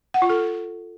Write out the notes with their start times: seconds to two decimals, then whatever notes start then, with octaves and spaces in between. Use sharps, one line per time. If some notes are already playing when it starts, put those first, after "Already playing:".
0.14 F#5
0.22 F4
0.30 A4